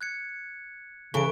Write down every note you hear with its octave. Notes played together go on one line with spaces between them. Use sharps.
F#6 G#6 C#7
C#3 E3 A4 C#6 D7